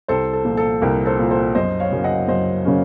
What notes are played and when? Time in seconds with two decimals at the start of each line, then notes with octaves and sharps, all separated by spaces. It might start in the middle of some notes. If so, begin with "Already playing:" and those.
0.08 C2 A4 C5
0.33 A4
0.45 A#2 F3
0.57 A4
0.82 C2 A#4
1.06 A4 C5
1.18 A#2 F3
1.31 A4 C5
1.55 F#2 C5 D#5
1.80 C#5 F5
1.91 C#3 F#3 A#3 C#4
2.04 D#5 F#5
2.28 F#2 C5 D#5
2.65 C#3 F#3 A#3 C#4